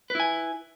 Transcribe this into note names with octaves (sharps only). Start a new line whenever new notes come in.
E4 B4 G#5